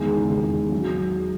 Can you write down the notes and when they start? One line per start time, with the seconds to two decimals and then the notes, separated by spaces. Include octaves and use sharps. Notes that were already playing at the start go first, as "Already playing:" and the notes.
Already playing: E2 D#3 G#3
0.17 C#3
0.31 G#3
0.44 E2
0.72 F#3